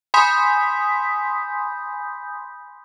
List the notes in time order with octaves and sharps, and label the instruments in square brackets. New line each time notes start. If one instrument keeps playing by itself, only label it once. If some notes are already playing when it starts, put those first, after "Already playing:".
[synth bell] G#5 B5 C6 D#6 G6 B6